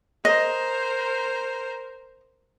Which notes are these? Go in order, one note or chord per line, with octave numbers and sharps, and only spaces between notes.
A#4 C5 D#5